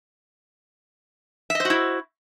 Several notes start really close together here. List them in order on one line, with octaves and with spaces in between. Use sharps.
E5 D#5 C5 F#4 E4